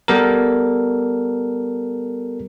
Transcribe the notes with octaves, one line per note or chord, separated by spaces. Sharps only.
G3 B3 A4 A#4